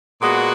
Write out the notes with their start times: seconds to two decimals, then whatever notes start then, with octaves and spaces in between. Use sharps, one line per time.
0.21 A#2 G#3 B3 F#4